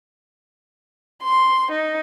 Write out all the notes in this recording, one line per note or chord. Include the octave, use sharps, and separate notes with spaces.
C6
D#4